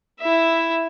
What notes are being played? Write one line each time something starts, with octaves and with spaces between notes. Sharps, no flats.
E4 E5